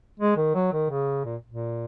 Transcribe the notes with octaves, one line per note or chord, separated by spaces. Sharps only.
G#3
D#3
F#3
D#3
C#3
A#2
A#2